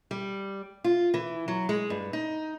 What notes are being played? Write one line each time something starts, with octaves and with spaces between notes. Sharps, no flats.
G3
F4
E3
F#3
G#3
G2
D#4